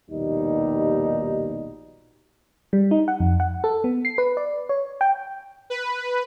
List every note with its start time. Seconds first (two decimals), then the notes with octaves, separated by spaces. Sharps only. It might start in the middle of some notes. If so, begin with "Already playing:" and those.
0.10 A#1 D#2 B2 G3 D#4
2.73 G3
2.91 D#4
3.08 F#5
3.20 F2
3.40 F#5
3.64 A4
3.84 B3
4.05 C7
4.18 B4
4.37 D5
4.69 C#5
5.01 G5
5.70 B4